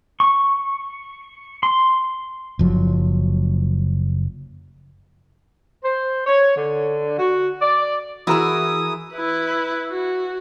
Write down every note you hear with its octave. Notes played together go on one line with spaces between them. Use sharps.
C#6
C6
F#1 F3 F#3
C5
C#5
D3
F#4
D5
E3 E4 F#4 G#4 A#4 D#6 E6
E4 B4
F#4